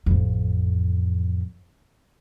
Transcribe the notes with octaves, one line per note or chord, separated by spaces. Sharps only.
A1 F2